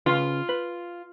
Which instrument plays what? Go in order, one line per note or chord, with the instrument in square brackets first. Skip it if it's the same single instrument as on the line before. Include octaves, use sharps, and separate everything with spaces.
[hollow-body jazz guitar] C#3 B4 C6 [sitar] F4
[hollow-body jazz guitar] B4